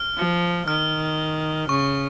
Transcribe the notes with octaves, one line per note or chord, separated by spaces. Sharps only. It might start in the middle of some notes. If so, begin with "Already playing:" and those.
Already playing: F6
F3
D#3 F6
C#3 C#6